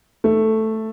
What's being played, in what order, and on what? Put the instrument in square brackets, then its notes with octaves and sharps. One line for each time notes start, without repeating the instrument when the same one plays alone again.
[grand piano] A3